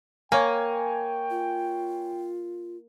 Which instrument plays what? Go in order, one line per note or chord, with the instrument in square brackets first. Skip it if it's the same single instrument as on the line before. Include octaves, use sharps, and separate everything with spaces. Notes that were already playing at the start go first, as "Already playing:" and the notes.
[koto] A#3 [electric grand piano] C#5 G#5 [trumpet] G5
[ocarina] F4